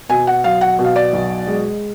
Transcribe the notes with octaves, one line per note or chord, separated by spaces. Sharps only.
B2 G#5
F#5
F#3 F5
F#5
B2
F5
D5
B1
G#3